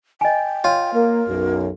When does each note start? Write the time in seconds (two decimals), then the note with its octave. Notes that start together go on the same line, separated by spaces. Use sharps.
0.21 D#5 G5 G#5
0.64 F4 C#5
0.93 A#3 A#4
1.28 B1 F#2